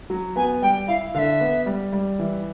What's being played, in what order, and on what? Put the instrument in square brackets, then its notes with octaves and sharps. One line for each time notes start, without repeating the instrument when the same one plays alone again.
[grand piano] F#3
[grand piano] B3 [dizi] G#5
[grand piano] G3 [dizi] G5
[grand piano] E4 [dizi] F5
[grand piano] D3 [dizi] E5 F5
[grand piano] B3
G3
G3
E3